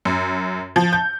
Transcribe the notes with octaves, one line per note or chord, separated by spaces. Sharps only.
F#2
F3
G6